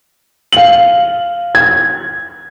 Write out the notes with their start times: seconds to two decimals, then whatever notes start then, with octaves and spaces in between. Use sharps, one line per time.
0.53 F5 F#7
1.55 G#6